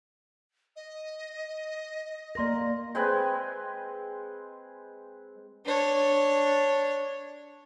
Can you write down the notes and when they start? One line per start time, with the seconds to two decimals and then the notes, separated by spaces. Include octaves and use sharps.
0.76 D#5
2.35 A#3 A#4 D5 C6 A#6
2.95 G#3 C4 B4 G#5
5.65 D4 C#5